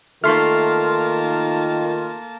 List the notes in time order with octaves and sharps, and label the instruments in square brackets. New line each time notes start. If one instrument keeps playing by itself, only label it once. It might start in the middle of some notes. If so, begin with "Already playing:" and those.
[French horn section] D#3 F4 [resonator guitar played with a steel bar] A3 [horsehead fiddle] A#3 A5 [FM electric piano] C6 F6